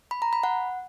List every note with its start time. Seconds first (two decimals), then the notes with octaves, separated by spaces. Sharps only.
0.11 B5
0.22 A#5
0.33 B5
0.43 F#5